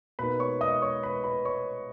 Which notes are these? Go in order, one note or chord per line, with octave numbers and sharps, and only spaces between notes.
B2 A#3 D#4 B4 B5
C#5 C#6
D#5 D#6
C#5 C#6
B4 B5
B4 B5
C#5 C#6